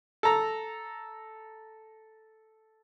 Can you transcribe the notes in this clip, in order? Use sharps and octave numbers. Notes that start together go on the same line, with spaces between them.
A4 A#5